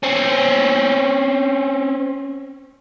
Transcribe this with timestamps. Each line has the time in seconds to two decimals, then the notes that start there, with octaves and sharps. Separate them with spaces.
0.03 C4 C#4